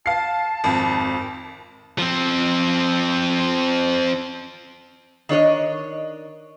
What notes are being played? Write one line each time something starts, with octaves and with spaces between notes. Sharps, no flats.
F5 A5 C7
G#1 F2
F3 C4
D#3 D4 C#5 D#5